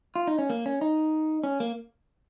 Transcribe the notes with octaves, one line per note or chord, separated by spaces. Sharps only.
F4
D#4
C#4
A#3
C#4
D#4
C#4
A#3